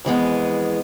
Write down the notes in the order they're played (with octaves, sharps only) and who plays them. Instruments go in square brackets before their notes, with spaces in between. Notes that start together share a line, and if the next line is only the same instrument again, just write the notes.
[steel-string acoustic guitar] F2 E3 G#3 B3